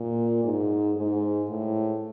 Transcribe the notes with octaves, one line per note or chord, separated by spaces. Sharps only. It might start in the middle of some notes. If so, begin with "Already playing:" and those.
Already playing: A#2
G#2
G#2
A2